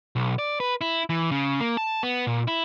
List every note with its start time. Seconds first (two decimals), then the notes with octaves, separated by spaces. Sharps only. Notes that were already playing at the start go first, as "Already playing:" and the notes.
0.16 B1
0.39 D5
0.60 B4
0.81 E4
1.10 E3
1.31 C#3
1.60 A#3
1.77 A5
2.03 B3
2.27 A#2
2.48 E4